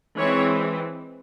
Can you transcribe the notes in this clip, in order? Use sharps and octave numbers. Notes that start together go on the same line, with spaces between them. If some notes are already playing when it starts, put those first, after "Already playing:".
E3 G#3 C4 C#5